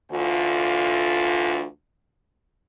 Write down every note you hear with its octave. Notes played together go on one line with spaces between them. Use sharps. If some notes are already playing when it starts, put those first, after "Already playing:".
D2 D3 E3 F4